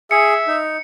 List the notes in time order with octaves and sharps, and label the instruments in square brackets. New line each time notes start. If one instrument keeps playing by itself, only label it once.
[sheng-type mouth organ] G#4 [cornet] E5 [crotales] C#7
[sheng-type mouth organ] D#4